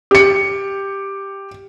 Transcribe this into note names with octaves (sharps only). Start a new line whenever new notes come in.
G4 C#7